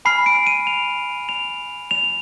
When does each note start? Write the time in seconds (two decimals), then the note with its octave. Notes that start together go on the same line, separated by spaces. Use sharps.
0.05 G#5 B5 F6 C7
0.26 D7
0.47 D#7
0.67 F7
1.29 F7
1.91 F7